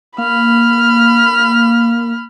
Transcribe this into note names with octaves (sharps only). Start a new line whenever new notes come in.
A#3 B5 F6